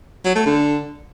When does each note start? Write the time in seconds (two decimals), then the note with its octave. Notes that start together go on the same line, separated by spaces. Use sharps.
0.25 F#3
0.36 A3
0.46 D3